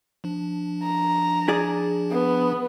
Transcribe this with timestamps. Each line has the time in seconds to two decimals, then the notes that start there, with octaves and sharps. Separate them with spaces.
0.24 F3 D4
0.83 A#5
1.48 G#4 D5
2.11 B3